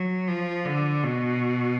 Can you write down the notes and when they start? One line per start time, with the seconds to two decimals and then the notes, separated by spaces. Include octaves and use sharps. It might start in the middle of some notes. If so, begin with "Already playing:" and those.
Already playing: F#3
0.28 F3
0.65 D3
1.04 B2